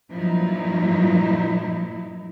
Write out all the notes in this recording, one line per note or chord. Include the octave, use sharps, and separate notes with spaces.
G2 A#2 F3 F#3 D#4 E4